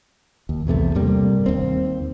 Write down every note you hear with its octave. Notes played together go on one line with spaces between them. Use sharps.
D#2
B1 E2 C3 A3
G2 C3 G3 A#3
D#2 C4